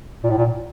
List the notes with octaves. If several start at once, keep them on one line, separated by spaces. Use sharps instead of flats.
A#2
A2
A#2